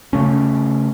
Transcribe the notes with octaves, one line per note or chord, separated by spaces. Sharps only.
C#3 A3 C#4